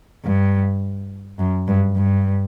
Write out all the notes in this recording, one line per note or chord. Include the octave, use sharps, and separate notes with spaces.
G2
F#2
G2
G2